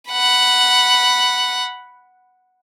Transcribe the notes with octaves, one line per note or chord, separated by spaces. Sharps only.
F#5 B5